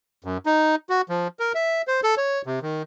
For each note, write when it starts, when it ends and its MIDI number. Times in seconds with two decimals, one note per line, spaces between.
0.24 0.38 42
0.46 0.75 63
0.89 1.02 66
1.09 1.28 53
1.39 1.52 70
1.55 1.82 76
1.88 2.01 72
2.03 2.15 69
2.17 2.42 73
2.46 2.59 48
2.62 2.82 51